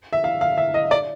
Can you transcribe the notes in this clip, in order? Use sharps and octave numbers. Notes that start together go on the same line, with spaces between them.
E5
F5
F5
E5
D#5
D5